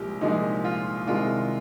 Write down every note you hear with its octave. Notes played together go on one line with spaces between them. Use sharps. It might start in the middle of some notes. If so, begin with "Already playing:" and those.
Already playing: C2 A#2 F3 G#3 G4
C2 A#2 F3 G#3 D#4
F4
C2 C3 D#3 G#3 F4